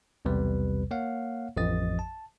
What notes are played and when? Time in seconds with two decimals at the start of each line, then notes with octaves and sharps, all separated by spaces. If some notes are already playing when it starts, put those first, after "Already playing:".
0.25 B1 E2 C3 G3 B4
0.91 A#3 C#5 F5 F#5
1.57 A1 F2 F3 D#5 D#6 A6
1.99 A5